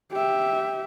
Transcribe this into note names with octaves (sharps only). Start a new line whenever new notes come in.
G4 E5